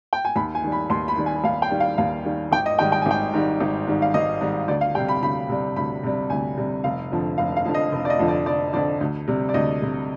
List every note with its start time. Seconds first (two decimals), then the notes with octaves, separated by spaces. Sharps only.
0.13 G5
0.25 G#5
0.36 D#2 B5
0.55 G#5
0.64 D#3 G3
0.72 B5
0.90 D#2 C6
1.08 B5
1.17 D#3 G3
1.26 G#5
1.44 D#2 F5
1.62 G5
1.71 D#3 G3
1.80 F5
1.98 D#2 F5
2.25 D#3 G3
2.52 G#1 G5
2.66 D#5
2.79 G#2 D#3 G3 G5
2.92 G5
3.02 G#5
3.06 G#1 G5
3.33 G#2 D#3 G3
3.60 G#1
3.87 G#2 D#3 G3
4.02 F5
4.14 G#1 D#5
4.41 G#2 D#3 G3
4.68 D2 D5
4.81 F5
4.95 C3 G3 G5
5.09 B5
5.22 D2 B5
5.49 C3 G3
5.76 D2 B5
6.03 C3 G3
6.30 D2 G#5
6.57 C3 G3
6.84 F1 F5
7.12 F2 D3 F3
7.38 F1 F5
7.56 F5
7.65 F2 D3 F3
7.74 D#5
7.92 F1
8.05 D5
8.10 D#5
8.19 F2 D3 F3
8.28 D5
8.46 F1 D5
8.73 F2 D3 F3 D5
9.01 D2
9.27 C3 G3
9.49 D5
9.54 D2 D#5
9.81 C3 G3